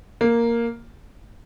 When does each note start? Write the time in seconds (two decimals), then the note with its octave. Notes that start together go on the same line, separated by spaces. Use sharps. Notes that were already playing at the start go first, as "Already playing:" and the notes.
0.21 A#3